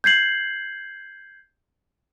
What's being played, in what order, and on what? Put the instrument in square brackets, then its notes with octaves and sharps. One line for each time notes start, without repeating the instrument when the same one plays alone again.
[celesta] G6 G#6 C7 F#7